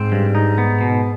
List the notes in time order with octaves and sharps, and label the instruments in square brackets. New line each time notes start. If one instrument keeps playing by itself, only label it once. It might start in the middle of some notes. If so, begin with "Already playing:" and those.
Already playing: [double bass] G#2 [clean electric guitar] C4
[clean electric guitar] G2
D#4
B3
B2